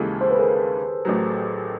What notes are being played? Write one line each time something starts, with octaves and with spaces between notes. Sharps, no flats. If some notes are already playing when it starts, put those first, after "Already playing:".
Already playing: D#2 C#3 E3 G#3 G4 A4
C5
B4
G#4 A#4
A1 A2 F#3